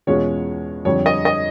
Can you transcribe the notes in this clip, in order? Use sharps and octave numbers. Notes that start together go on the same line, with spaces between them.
E2 B2 G#3 C#4 F4 C#5
F2 D3 G3 C#5
D#5
D#5